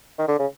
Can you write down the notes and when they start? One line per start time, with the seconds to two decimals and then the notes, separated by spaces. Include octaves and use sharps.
0.19 D#3
0.28 D3
0.39 C#3